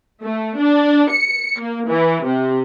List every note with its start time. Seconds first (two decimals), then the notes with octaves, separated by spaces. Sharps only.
0.22 A3
0.58 D4
1.11 C#7
1.60 A#3
1.89 E3
2.26 C3